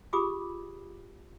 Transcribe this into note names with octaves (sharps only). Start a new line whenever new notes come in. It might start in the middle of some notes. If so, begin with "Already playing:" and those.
F4 G4 G#4 B5 D6 D#6